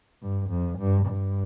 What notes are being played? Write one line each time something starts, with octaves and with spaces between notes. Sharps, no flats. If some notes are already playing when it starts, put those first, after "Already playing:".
G2
F2
G2
G2